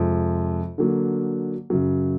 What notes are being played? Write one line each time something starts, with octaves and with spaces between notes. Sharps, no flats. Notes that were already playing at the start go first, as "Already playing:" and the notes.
Already playing: F2 C3 F3 G#3
D3 F#3 A#3
F#2 C#3 F#3